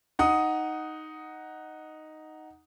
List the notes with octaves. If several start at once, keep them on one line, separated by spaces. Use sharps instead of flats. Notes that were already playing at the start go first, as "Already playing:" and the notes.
D#4 F#5 D#6